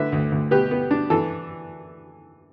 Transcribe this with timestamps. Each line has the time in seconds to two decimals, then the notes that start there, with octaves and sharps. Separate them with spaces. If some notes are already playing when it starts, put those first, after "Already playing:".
Already playing: A2 D3 B4 E5
0.12 D2
0.32 D2
0.51 B2 G4 B4
0.71 B3
0.91 D4
1.10 E3 A4